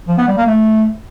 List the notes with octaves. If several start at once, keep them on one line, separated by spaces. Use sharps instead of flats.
F3
B3
G3
A#3
A3